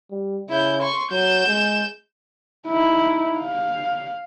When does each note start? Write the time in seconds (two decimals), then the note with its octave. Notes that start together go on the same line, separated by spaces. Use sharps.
0.11 G3
0.50 C#3 E4 G6
0.82 C6 C#6
1.11 F#3 G6 E7
1.47 G#3
2.67 D#4 E4
3.39 F5